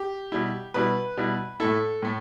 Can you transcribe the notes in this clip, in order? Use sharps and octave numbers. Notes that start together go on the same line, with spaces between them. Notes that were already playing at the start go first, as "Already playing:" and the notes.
Already playing: G4
B2 G3 E4
B2 G3 E4 B4
B2 G3 E4
A2 A3 E4 A4
A2 A3